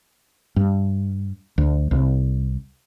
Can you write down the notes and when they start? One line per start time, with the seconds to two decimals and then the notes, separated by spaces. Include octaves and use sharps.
0.56 G2
1.58 D2
1.91 C2